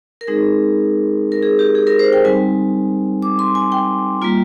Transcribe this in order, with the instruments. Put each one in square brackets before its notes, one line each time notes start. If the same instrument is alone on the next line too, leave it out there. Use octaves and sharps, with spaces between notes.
[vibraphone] A#4
G#3 C4 D#4 G#4
A#4
G#4
G4
G#4
A#4
C5
G5
G3 C4 D#4 G#5
D6
C6
G#5
G5
G3 A#3 F4